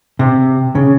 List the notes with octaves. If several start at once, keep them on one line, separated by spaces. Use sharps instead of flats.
C3
C#3